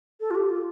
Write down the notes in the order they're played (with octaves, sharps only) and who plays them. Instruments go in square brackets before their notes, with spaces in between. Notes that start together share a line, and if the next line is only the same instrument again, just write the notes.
[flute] A4
F4
G4
F4